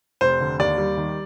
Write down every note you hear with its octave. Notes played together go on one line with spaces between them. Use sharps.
F1 C5
D3
D#2 D5
G3
D#3